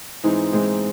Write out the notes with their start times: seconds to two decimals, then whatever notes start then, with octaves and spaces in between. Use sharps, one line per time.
0.24 G#2 E3 G#3 C4 D#4
0.53 G#2 E3 G#3 C4 D#4